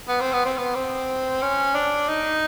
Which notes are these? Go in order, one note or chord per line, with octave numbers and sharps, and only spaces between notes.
B3
C4
B3
C4
B3
C4
C#4
D4
D#4